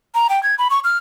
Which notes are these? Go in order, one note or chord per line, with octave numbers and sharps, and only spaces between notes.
A#5
G5
G#6
B5
C#6
F6